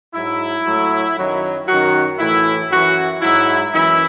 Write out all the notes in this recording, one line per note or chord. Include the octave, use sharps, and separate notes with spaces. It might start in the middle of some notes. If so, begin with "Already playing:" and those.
G#2 F#3 E4
A2 F#3
F#2 D#3 F#3
F#2 D#3 F#3 F#4
A2 E3 E4
F#2 E3 F#4
G#2 F#3 E4
F#2 E3 E4